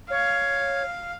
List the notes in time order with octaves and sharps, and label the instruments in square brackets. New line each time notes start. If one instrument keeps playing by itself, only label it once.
[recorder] C#5 [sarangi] F5